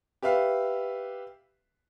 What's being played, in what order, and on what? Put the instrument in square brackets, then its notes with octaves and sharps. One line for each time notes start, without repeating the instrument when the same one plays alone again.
[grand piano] G4 B4 E5 F5